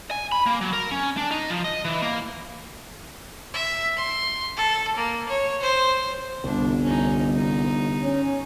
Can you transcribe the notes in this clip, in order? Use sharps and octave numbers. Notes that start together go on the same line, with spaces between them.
G#5
B5
A#3
F#3
A#4
C#4
D4
D#4
F3
D#5
E3
A#3
E5
C6
A4
A#3
C#5
C5
G1 C2 D4
C#4 D#4
D#4
C#4